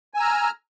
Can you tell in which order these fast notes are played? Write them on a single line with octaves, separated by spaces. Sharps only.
G#5 E6 A#5 F6